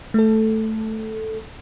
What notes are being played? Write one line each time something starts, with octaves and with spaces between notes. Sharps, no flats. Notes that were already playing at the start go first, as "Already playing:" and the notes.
A3 A4